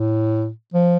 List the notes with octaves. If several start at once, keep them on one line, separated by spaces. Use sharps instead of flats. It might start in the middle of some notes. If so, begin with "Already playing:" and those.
Already playing: A2
F3